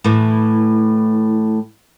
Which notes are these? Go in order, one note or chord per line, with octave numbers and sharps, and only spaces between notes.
A2 E3